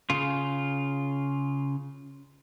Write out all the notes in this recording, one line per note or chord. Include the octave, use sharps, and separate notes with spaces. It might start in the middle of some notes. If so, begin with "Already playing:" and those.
C#3 F4